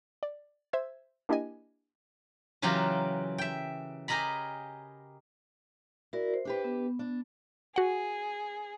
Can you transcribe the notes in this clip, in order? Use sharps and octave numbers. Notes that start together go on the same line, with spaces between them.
D5
C5 E5 E6 G#6
A#3 D4 E4 G4 D#5 G#5
C#3 E3 F#3 F4 G4 A#4
E5 G5
G4 G#4 A#4 D#5 A#5 B5
E4 F#4 A#4 D5
C5
D4 G4 B4
B3
D4
F#4 G#4 F#5